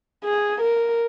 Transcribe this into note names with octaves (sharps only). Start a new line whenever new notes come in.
G#4
A#4